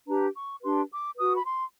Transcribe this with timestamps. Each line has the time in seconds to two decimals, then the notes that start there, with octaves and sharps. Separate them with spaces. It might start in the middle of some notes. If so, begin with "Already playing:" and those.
0.07 D4 G4 B4 A#5
0.35 C#6
0.62 D4 G4 B4 C6
0.90 D6
1.16 F#4 B4 D#6
1.35 B5
1.44 C6